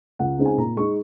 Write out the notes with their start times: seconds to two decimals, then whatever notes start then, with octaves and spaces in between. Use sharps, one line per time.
0.19 C#2 F#5
0.38 C#3 G#3 C4 D#4
0.46 G#5
0.57 A#2 A#5
0.77 G#3 D#4 C#6